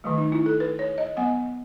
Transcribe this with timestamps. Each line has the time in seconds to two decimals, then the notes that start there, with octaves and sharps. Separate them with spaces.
0.04 D#3 F#3 A3
0.18 D#4
0.32 E4
0.46 A4
0.60 B4
0.79 C#5
0.98 D#5
1.17 F#3 B3 F#5